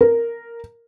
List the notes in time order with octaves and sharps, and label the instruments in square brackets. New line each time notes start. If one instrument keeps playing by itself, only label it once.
[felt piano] A#4